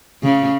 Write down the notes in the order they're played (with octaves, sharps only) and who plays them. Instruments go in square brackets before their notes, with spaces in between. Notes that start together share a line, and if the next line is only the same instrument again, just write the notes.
[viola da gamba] C#3